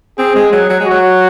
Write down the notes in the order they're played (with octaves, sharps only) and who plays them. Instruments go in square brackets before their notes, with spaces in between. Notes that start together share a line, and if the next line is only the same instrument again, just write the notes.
[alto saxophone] C4 [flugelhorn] G#4
[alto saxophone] G#3
F#3
F#3
G#3
[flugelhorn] F#4
[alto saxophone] F#3